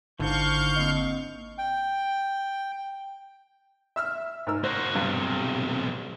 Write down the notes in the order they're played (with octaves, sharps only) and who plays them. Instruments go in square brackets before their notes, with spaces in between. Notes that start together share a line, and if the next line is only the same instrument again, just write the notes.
[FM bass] G#1 [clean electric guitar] D3 [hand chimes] D#4 E4 C5 [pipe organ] F5 C#6 G6
[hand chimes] A#3 C4 D#5
[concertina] G5
[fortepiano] E5 E6 F6
G#2 A#4 E6
[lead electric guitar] A#3 F#4 [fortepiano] C5
[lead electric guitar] B1 C3 [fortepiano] G2